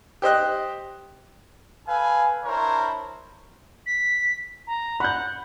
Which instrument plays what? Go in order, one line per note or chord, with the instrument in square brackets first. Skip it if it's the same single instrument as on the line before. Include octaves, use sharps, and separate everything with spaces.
[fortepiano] G4 C5 D#5 F#6
[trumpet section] A4 B4 F5 G#5
D4 E4 A#4 C5 C#5
[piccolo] B6
A#5
[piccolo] F#5 [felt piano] B5 G6